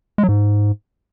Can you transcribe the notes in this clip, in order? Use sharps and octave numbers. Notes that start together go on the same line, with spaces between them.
G#3
F#3
G#2